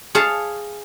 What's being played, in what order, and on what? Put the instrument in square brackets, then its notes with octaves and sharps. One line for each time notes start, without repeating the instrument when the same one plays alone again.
[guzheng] G#4 C#5 F5 A5